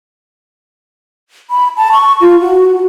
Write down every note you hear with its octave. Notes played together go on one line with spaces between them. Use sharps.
B5
A5
C#6
F4
F#4